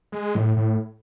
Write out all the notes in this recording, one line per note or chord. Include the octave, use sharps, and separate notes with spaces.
G#3
A2
A2